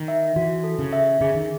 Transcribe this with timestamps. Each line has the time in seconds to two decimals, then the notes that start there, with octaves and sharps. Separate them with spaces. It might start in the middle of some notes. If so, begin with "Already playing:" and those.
Already playing: D#3
0.08 E5
0.36 E3 F#4
0.64 A4
0.79 C#3
0.93 E5
1.21 C#3 G#4
1.34 D#3